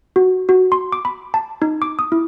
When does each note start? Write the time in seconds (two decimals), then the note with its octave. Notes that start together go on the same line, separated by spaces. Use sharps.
0.16 F#4
0.49 F#4
0.72 C6
0.92 D6
1.05 B5
1.34 A5
1.62 D#4
1.82 D6
1.99 D#6
2.12 E4